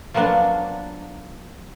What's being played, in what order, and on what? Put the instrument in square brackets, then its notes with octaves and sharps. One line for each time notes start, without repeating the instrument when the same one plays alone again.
[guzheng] F3 F#3 A#3 B3 D4